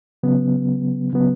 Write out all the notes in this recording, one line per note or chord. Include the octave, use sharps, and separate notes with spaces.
C#3 F#3 B3
C#3 F#3 B3